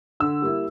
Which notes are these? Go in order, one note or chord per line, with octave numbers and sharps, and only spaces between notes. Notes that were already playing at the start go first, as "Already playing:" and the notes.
D3 E6
G3 A#3 E4